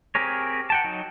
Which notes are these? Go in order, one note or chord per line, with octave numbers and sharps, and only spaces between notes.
C4 G4 G#4 A#4 C#5
F#5 G5 A5
F#3 D#4